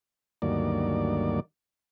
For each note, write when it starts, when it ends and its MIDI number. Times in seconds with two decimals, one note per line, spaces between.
0.42 1.40 38
0.42 1.40 43
0.42 1.40 51
0.42 1.40 54
0.42 1.40 58
0.42 1.40 74